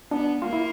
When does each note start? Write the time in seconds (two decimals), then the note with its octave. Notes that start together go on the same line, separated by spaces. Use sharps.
0.11 B3 D4
0.42 A#3 F4
0.53 E4